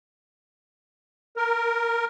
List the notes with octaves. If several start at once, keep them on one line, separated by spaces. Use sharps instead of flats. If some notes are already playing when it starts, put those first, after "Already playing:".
A#4